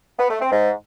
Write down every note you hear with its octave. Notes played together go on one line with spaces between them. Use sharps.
B3
A3
C4
G#2